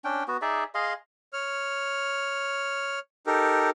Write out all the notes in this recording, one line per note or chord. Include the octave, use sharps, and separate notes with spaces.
C#4 D4 G5
B3 F#4
D#4 G#4 D5 E5
G#4 D#5 F5 C6
C#5 F6
D#4 G4 A4 A#4